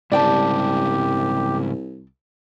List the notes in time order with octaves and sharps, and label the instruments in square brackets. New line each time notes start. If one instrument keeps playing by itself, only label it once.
[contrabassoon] C2 [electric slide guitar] G#2 C#3 G3 [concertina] G4 [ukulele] D5 G5 A5